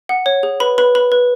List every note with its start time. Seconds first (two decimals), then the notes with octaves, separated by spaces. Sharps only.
0.09 F#5
0.26 C#5
0.43 G#4
0.60 B4 B5
0.78 B4 B5
0.95 B4 B5
1.12 B4